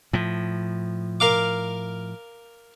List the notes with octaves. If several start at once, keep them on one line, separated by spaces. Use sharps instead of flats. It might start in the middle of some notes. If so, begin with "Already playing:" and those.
A2 F3
A#4 F5 D6